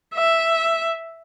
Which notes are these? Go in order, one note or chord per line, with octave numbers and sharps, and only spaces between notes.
E5